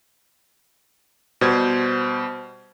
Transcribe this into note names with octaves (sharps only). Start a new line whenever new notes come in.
B2 G3 C5 G#6